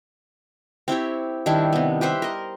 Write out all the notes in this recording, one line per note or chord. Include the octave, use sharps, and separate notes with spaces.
C4 E4 G4 C#5
D#3 G3 D4 E4
C3 B3
G4 B4 C5 E5
A#4 D#5